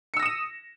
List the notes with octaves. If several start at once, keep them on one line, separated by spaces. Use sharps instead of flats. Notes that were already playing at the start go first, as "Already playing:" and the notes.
D#6 E6 A#6 C#7 E7